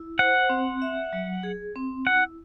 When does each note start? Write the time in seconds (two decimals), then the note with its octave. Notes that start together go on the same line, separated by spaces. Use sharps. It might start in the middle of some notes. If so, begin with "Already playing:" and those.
Already playing: E4
0.19 C5 F#5
0.50 C4
0.82 E5
1.13 F#3
1.43 G#4
1.76 C4
2.06 E4 F#5